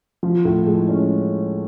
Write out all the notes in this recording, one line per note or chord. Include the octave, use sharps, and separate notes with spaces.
F3
A2
G#3
C#4